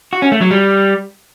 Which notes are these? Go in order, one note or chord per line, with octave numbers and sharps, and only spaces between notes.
F#4
C#4
A3
F#3
G3